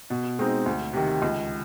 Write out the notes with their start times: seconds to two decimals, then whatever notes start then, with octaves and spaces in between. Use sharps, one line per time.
0.10 B2
0.39 G#3 C4 D#4
0.66 D2
0.93 C3 D#3
1.22 C#2